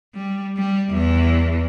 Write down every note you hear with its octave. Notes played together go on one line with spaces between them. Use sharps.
G3
G3
E2 E3